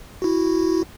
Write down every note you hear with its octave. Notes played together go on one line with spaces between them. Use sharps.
E4 F#4